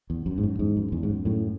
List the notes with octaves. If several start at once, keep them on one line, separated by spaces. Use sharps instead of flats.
E2
F#2
G#2
F#2
E2 G#2
F#2
E2
G#2
F#2
F#2 A2